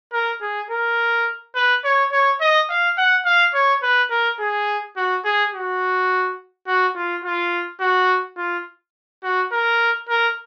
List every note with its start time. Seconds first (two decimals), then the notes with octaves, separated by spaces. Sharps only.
0.13 A#4
0.41 G#4
0.70 A#4
1.55 B4
1.84 C#5
2.12 C#5
2.41 D#5
2.69 F5
2.98 F#5
3.25 F5
3.54 C#5
3.83 B4
4.11 A#4
4.39 G#4
4.96 F#4
5.24 G#4
5.54 F#4
6.67 F#4
6.96 F4
7.24 F4
7.80 F#4
8.37 F4
9.23 F#4
9.52 A#4
10.09 A#4